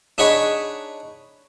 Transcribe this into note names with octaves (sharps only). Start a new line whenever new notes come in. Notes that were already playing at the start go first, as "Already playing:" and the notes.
D4 D#4 G#4 C#5 F#5 B5